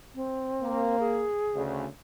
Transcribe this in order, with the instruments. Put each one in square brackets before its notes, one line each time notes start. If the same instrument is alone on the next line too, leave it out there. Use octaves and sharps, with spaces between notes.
[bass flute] C4
[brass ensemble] A#3
[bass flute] G#4
[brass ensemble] D2 C#3